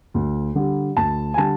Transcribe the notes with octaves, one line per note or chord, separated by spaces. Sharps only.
D2
D3 G3
D2 A5
G#5
D3 G3 A5